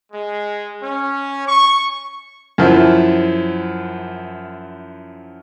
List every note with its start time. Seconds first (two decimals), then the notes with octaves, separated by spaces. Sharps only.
0.12 G#3
0.81 C#4
1.47 C#6
2.58 F#2 F3 E4